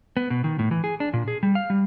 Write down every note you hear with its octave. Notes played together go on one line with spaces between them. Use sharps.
B3
B2
D#3
A2
E3
G#4
D4
A#2
G#4
G3
F5
G3